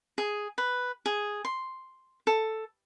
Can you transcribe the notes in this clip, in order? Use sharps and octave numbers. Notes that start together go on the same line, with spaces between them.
G#4
B4
G#4
C6
A4